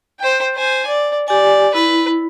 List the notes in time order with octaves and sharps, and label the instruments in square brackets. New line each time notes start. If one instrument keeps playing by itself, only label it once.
[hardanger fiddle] C5 G5
C5 G#5
D5
[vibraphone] G4 G#5 [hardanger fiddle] D5
[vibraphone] E4 [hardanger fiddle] B4